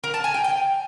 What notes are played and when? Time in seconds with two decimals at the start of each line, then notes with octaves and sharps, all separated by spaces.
0.04 A#4
0.14 A5
0.24 G#5
0.34 G5
0.44 G5